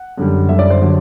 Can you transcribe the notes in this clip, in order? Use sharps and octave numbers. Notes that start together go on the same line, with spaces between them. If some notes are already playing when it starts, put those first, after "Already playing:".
Already playing: F#5
F#2 D3 G3
F#2 D3 G3 E5
D5
C5
D3 F#3